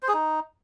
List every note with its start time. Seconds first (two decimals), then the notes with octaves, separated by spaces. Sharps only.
0.03 C5
0.08 G#4
0.14 D#4